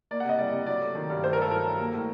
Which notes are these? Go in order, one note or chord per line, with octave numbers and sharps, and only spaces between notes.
A#3 D5
F#5
C3 D#5
G3 D5
C3
F#3 D5
A3
D#3
G2
A3 C5
A#4
G2 A4
F#3 A#4
G2
A#3
A2